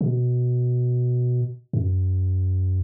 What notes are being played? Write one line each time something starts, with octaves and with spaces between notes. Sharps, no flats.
B2
F#2